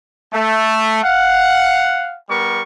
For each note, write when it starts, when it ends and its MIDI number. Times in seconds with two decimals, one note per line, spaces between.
0.33 1.02 57
1.03 2.16 77
1.03 2.16 78
2.29 2.62 55
2.29 2.62 59
2.29 2.62 70
2.29 2.62 85